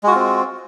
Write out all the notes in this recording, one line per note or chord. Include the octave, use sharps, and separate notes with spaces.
G#3 C4 F4 F#4